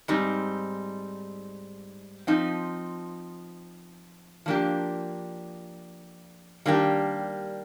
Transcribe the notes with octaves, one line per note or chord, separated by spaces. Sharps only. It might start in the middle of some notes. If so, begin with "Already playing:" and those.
G#2 G3 C4 D#4
F3 C4 D#4
F3 A#3 D4 G4
D#3 G3 A#3 D4 G4